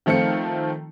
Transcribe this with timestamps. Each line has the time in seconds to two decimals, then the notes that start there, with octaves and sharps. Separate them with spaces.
0.06 D#3 F3 A3 C4 F4 C#7